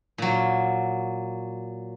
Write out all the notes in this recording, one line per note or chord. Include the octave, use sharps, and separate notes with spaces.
A#2 F#3